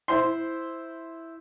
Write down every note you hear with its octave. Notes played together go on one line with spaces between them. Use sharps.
E4 C5 C6